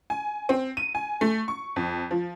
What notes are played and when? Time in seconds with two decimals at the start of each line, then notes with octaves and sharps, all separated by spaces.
0.10 G#5
0.49 C4
0.77 D#7
0.95 G#5
1.21 A3
1.48 C#6
1.76 F2
2.11 F3